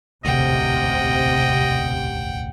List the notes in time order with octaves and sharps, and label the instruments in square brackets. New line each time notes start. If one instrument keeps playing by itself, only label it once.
[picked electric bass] E1 A1 D2 [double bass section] C3 [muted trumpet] D#5 [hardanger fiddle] F#5 G5